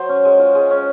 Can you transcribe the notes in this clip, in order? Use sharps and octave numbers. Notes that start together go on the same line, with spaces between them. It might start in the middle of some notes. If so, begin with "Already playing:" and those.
Already playing: F#3 C5
C#4
G#3
F4
G#3
C#4